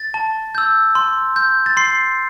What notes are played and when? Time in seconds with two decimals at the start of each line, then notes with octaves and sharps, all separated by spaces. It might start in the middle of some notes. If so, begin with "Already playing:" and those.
Already playing: A6
0.14 A5
0.55 E6 G6
0.95 C6
1.36 G6
1.66 A6
1.77 C6 C7